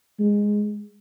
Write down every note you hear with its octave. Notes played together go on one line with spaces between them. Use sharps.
G#3